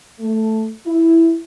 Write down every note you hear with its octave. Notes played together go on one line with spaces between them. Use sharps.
A3
E4